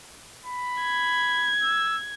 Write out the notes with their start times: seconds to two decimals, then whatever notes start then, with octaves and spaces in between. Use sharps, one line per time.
0.45 B5
0.82 G#6
1.63 E6